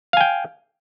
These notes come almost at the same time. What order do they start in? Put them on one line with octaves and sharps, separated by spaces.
F5 G#5 G5